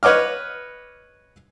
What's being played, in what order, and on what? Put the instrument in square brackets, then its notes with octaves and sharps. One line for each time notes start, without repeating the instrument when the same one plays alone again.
[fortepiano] B4 C#5 D#5 D6 F6